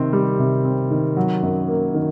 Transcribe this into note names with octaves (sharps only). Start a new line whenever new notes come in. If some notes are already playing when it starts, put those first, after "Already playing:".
Already playing: C3 D#3 C4
G3
C3
C4
D#3
F#3
F#2
A#3
D#3